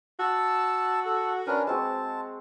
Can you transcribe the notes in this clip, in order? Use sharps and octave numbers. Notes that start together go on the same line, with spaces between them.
F#4 A5 E6
A4
C#4 D4 A#4 B4
G#3 C4 F#4 A5